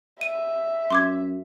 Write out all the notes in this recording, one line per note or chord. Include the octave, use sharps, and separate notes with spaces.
E5 D#7
F#2 C6 D6 G#6